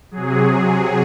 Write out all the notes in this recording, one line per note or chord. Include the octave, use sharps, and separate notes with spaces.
C3 F#3 G#4